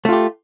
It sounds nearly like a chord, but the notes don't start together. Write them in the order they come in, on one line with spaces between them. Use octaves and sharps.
A3 F4 G4